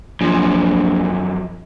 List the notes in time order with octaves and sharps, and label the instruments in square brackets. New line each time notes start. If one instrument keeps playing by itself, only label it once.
[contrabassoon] A#1 [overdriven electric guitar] F#2 F3